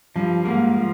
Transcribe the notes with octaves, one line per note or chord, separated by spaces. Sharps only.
G2 F3
G#2 A#3
F3